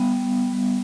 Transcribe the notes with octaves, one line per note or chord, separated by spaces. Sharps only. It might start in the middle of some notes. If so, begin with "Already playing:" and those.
Already playing: G3 B3
B3
B3
G3